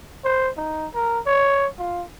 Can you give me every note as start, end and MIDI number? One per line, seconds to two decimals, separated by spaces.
0.24 0.50 72
0.57 0.87 63
0.94 1.19 70
1.26 1.67 73
1.78 2.04 65